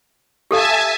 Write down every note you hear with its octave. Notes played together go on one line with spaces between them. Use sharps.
G4 A4 E5 F5 G#5 A5